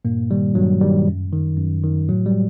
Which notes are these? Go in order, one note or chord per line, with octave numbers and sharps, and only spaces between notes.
G2 A#2 A#3
D#3 G3
G2 F#3
D#3 G3
F#2
D#3
F#2
D#3
A2 F#3
G3